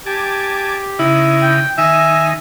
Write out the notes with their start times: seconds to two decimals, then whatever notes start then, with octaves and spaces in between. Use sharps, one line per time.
0.06 G4 G#5 A5 D6
0.99 C#3 D#4 E4
1.42 G5
1.78 D#3 D#4 E5 G#5